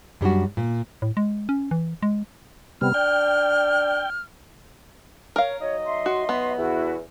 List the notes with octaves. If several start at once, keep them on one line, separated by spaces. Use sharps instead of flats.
F#2 G3 D4 F#4
A#2
A2
G#3
C#4
E3
G#3
C3 G3 B3 F6
D4 G5
A#4 C#5 F5
F#3 D#4 C#5 D#5
E5 C6
F#4
B3
E2 E4 F#4